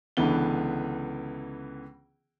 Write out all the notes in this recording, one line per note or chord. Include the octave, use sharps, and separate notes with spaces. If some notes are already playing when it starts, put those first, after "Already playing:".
C#2 D3 E3 B3 G7